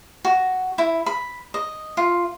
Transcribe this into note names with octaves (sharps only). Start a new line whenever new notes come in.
F#4
E4
B5
D#5
F4